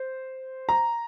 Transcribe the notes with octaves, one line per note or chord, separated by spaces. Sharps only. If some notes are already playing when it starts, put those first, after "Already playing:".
Already playing: C5
A#5